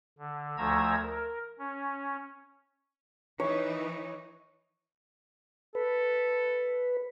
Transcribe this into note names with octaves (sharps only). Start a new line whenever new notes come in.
D3
D2 F3 A3 A#5 E6 G#6
A#4
C#4
E3 D#4 C#5
A4 B4